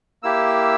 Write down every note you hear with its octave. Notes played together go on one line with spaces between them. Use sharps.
A#3 E4 G4 E6